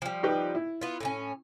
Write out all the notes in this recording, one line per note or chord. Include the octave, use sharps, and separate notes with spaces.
F3 G3
D#4 G4 B4
E4
B3 F4
A2 A#3 C#4